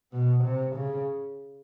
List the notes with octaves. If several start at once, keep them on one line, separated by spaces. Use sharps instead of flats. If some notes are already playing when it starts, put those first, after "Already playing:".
B2
C3
C#3